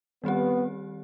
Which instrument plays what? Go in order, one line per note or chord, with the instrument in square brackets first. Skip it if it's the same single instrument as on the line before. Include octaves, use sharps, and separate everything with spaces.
[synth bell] D#3 G3 C4 G4 [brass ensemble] B3